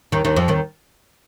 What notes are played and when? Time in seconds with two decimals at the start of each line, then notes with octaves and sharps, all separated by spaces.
0.12 D#2 D#3
0.25 D#2 D#3
0.36 F2 F3
0.48 D#2 D#3